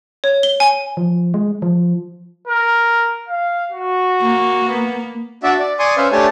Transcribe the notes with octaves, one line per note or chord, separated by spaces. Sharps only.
C#5
G7
G#5
F3
G#3
F3
A#4
F5
F#4
A#3
B3
D4 F#4 D5 E5
D5
D5 G#5 C6 C#6 D#6
C#4 B4 C5 E5 F5
A3 D4 G4 C#5 G#5 A5